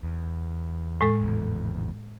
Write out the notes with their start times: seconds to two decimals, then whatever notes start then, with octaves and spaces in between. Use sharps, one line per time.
0.03 E2
1.01 A2 G#3 A4
1.21 G#1 E2